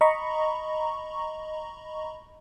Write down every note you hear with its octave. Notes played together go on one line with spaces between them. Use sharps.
D#5 A#5 B5 C#6